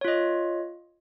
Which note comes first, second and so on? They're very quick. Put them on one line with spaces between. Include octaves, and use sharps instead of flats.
C#5 F4 D#5